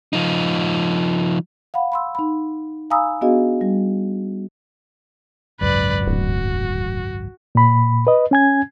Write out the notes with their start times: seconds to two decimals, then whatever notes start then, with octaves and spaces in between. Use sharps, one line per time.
0.13 F3 D#4
1.74 F5 F#5 B5
1.92 B5 C6 E6
2.15 D#4 B5
2.90 F5 G#5 A#5 B5 D#6 E6
3.21 B3 D4 F#4 G#4 D#5 F5
3.61 G3
5.61 G#1 C#2 F#2 B4 D5
6.06 D1 F#4
7.55 A#2 B5
8.07 B4 D#5
8.31 C#4 G#5 G#6